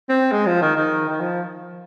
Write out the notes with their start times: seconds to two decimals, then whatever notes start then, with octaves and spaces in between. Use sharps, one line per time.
0.09 C4
0.32 G#3
0.47 F3
0.62 D#3
0.76 D#3
1.09 D#3
1.21 F3